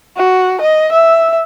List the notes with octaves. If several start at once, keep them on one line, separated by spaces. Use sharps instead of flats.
F#4
D#5
E5